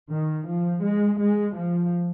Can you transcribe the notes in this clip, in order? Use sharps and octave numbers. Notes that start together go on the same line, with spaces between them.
D#3
F3
G#3
G#3
F3